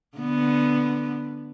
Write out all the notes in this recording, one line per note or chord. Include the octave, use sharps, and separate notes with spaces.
D3 B3